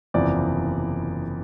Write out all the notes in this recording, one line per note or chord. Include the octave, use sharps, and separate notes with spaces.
F#1 E2 C3 F3 D5